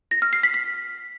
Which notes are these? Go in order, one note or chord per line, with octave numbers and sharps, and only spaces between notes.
A#6
F6
C7
B6
B6